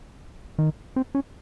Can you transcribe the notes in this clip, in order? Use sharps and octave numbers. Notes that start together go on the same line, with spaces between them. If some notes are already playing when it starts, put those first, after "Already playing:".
D#3
C4
C#4